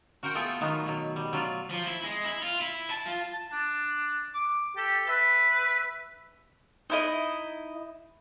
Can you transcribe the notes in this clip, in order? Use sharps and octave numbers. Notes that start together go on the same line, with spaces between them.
F#4 A#4 C5 F#5 G5
A3 B3 F4 G#4 A4 G5
D#3 F#3 B3 D#4 F4 F#4
B2 F#3
G3
F#3 F4 D5
F3
E4
G#3
E4
F4
E4
A5
F4
A5
D4
D6
G4 A4
B4 E5
D#4 E4 D#5